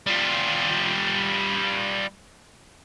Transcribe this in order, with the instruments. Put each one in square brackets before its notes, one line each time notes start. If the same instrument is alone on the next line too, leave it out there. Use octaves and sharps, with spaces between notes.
[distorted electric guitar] G3 F4